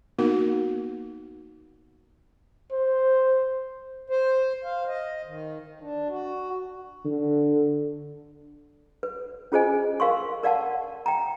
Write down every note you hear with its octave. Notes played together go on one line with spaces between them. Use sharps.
A#3 B3 D#4 F#4 A#4
C5
C5
F5
D#5
D#3
D#3
D4
F#4
D3
B4
C#4 F4 G#4 C5 D#5 G#5
A#4 F5 C6 C#6
A#4 D5 F5 F#5 A5
G5 A#5